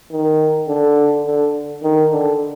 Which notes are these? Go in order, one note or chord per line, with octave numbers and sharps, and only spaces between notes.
D#3
D3
D3
D#3
D3